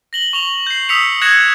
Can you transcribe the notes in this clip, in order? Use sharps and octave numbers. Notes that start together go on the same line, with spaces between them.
A#6 F#7 G7
C#6 F7 G7
G6 C7
D#6 E6 B6 C#7 F7
D#6 F#6 G#6 A#6 C#7 E7